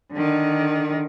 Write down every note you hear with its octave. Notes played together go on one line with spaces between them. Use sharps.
D3 D#3